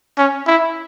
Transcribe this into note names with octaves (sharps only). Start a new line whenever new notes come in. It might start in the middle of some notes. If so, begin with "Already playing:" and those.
C#4
E4